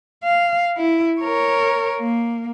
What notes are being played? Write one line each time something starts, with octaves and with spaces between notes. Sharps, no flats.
F5
E4
A#4 C#5
A#3